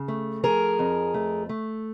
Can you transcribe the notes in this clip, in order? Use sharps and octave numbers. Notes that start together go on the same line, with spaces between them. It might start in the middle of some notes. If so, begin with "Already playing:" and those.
Already playing: C#3
A3
F3 G#4 A#4
F2
A3
A3